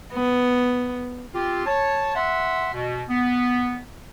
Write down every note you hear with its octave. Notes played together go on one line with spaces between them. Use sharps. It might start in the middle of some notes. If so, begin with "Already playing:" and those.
B3
C4 F4 G4
C#5 A5
E5 F#5 C6
B2
B3